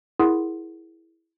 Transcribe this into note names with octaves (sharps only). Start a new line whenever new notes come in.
E4 G#4 A#4 F#5 C6 D#6